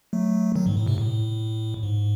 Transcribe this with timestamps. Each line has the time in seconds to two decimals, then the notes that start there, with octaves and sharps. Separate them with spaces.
0.13 F#3 A3
0.56 D#3 F#3
0.66 G#2
0.77 A2
0.87 G#2 C3
0.98 A2
1.83 G#2